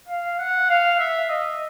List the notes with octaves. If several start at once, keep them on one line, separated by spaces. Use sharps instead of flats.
F5
F#5
F5
E5
D#5